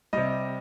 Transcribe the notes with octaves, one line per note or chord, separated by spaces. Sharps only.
C3 G3 D#5